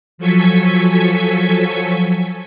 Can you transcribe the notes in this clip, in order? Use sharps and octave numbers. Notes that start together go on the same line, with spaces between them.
F3 F#3 A4 G#5 C#6 B6